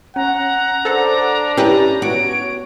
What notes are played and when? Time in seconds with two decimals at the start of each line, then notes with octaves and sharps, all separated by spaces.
0.16 C#4 F#5 A#5
0.85 D4 A4 C5 F#5
1.57 C#4 E4 G4 B4 A#5
2.02 B3 F#4 C#5 D7